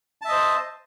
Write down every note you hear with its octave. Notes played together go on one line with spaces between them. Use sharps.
C5 D#5 E5 A5